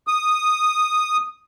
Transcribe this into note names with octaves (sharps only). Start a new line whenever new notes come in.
D#6